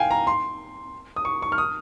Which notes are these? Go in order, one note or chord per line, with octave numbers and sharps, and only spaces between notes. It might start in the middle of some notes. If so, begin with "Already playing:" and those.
Already playing: F5 G5 G#5
A#5
C6
D#6
C#6
C#6
F6
D#6